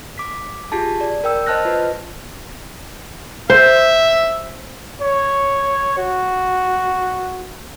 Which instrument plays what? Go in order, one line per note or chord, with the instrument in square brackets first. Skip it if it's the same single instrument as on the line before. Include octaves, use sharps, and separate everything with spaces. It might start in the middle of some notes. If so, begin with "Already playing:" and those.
[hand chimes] D6 B6
F4 G4 G#4 A5
D5
A#4 G5 E6
C5 D#5 A5 F6 F#6 A#6
F4 B4 D#5
[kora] C5 [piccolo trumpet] E5
[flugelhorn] C#5
F#4